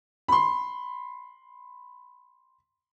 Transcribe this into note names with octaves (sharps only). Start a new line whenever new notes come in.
B5 C6